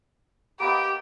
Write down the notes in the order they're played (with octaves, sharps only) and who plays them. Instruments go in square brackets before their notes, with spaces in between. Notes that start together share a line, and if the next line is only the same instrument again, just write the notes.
[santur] A#3 B3 D#5 [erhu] G4 [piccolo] D7